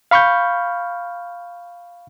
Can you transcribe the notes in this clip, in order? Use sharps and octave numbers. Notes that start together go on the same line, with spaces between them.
F5 B5 C#6 F6 G6